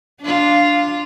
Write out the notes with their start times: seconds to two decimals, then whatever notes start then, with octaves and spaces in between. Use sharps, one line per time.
0.22 D4 F4